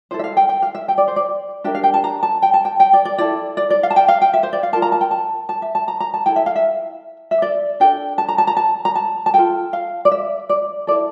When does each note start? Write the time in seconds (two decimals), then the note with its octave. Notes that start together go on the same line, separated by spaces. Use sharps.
0.11 E4 A4 C5
0.19 E5
0.24 F5
0.37 G5
0.49 G5
0.62 F5
0.75 E5
0.88 G5
0.98 D5
1.08 C5
1.16 D5
1.64 D4 G4 A#4 E5
1.75 F5
1.84 G5
1.94 A5
2.04 A#5
2.23 A5
2.42 G5
2.54 A5
2.65 G5
2.80 G5
2.93 D5
3.05 D5
3.18 E4 A4 D5
3.57 D5
3.70 D5
3.83 F5
3.91 A5
3.96 G5
4.08 F5
4.22 G5
4.33 E5
4.43 C5
4.53 D5
4.63 F5
4.73 A#4 A5
4.76 F4
4.82 A#5
4.92 A5
5.01 G5
5.11 A5
5.49 A5
5.62 E5
5.75 A5
5.88 A#5
6.00 A#5
6.14 A5
6.26 E4 A4 G5
6.36 E5
6.46 F5
6.56 E5
7.31 E5
7.42 D5
7.80 D4 A4 G5
8.18 A5
8.29 A#5
8.38 A5
8.47 A#5
8.57 A5
8.85 A#5
8.95 A5
9.26 A5
9.34 F4 A4 G5
9.73 F5
10.05 D5
10.11 E5
10.49 D5
10.87 E4 A4 D5